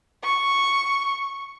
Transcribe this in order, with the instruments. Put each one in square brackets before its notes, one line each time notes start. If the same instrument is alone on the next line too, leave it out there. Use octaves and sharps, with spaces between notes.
[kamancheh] C#6